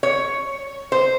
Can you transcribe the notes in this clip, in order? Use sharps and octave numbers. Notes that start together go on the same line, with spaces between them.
C#5
C5